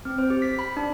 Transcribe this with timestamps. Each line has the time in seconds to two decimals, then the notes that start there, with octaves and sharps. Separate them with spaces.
0.05 C4
0.18 C5
0.30 G4
0.42 B6
0.59 B5
0.77 D4